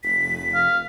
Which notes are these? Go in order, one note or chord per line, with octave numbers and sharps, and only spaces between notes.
F1 B6
F5